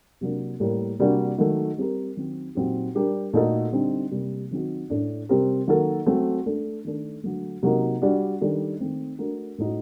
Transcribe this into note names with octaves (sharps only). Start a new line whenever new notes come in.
C3 F#3 A#3 D4
A2 G3 A#3
C3 G3 A#3 D4 F#4
D#3 F#3 A3
G3 C4 G4 A#4
D#3 F#3 C4
A#2 F#3 C4 D#4 G4
G3 D4 G4 A#4
A#2 A3 D#4 F#4 A4
D3 G3 C4 D#4
C3 G3 A#3
D#3 F#3 C4 D#4 F#4
A2 A3 D4
C3 G3 C4 G4 A#4
D#3 F#3 A#3 F#4 A4
F#3 A3 C4 F#4
A3 D4 A4
D#3 A3 D4 A4
D3 F#3 A3
C3 F#3 A#3 D#4
G3 D4 F#4
D#3 G3 D4 A4
D#3 A3 C4
A3 D4 F#4 A#4
A2 A3 D#4 F#4